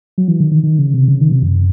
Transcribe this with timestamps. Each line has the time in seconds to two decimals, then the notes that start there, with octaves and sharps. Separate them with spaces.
0.18 F#3
0.28 E3
0.40 D#3
0.51 D#3
0.63 D#3
0.79 C#3
0.94 C3
1.08 C#3
1.20 D#3
1.32 C3
1.43 F#2